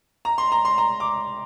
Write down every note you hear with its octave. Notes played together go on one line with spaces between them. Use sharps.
A#5
C6
A#5
C6
A#5
D6